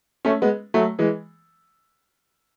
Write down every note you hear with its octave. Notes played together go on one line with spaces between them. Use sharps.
A3 C#4
G#3 B3
F#3 A3
E3 G#3